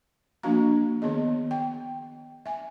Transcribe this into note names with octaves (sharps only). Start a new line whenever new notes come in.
F3 A#3 D4 F#4 F5 A#5
D#3 B3 G#4 D#5
G5
E5 G#5